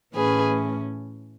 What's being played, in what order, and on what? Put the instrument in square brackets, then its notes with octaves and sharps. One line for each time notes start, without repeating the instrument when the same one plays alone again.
[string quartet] A2 E3 A3 C#4 G#4 B4